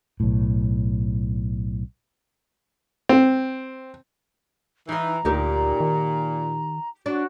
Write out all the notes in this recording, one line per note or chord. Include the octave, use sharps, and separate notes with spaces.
B1 A2
C4
E3 D#4 F5 A#5
D2 A#2 D#4 G4 A#4
D#3
D4 F#4